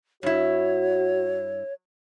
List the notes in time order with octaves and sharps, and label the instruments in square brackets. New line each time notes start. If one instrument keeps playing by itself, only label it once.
[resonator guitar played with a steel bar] G2 E4 [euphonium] F#4 [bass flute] C#5